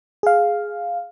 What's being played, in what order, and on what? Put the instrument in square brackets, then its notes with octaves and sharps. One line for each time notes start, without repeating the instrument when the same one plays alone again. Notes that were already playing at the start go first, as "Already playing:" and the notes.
[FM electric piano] G#4 F5